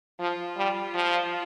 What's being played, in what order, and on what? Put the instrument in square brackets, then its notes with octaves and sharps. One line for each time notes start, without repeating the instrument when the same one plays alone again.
[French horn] F3 [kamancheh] F4
[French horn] G3
F3